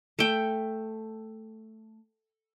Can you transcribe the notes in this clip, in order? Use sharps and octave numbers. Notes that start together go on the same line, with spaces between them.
A3 G5